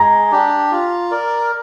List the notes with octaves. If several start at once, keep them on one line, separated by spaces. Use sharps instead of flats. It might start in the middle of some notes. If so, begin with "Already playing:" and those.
Already playing: G#3 A#5
D4 G4
F4
A#4 D5